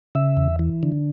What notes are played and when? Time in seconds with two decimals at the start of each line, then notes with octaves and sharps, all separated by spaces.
0.15 C#3 E5
0.37 E2
0.59 E3
0.83 D3